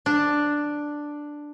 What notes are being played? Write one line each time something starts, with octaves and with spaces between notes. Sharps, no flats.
D4